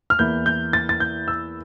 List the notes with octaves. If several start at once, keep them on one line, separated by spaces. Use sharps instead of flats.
F6
E2 E3 A#3 E4 G6
G6
A6
A6
G6
E6